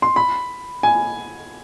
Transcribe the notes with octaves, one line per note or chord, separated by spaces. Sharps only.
C6
B5
G#5